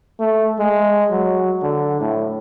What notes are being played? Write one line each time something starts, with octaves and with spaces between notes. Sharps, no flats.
A3
G#3
F#3
D3
A2